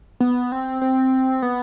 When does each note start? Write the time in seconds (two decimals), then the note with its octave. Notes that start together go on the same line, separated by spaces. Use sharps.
0.20 B3
0.52 C4
0.81 C4
1.42 B3